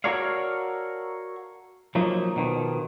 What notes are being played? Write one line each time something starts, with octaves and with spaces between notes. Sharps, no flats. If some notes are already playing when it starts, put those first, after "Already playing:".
F#4 A4 A#4 C#5 D5 F5
F3 F#3 A#3 D#4
B2 D#3 F3